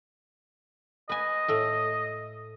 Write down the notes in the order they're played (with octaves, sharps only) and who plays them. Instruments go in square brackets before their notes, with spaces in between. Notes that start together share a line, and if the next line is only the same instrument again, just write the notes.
[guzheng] B4 G#5 [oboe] D#5
[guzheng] A2 A3